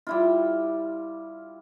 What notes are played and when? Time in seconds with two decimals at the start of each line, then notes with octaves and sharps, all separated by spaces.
0.07 G3 E4 F4